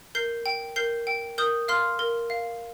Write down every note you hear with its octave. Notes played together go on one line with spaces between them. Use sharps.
A#4 G6 C7
G5
A#4 G6 C7
G5
A#4 D#6 G6
F5 C6 F6
A#4
F5